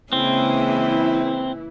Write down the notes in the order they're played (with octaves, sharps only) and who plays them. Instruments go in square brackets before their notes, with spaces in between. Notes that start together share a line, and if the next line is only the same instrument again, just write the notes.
[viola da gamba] C#3 G#3 A#3 [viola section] E3 E4 [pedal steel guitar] C4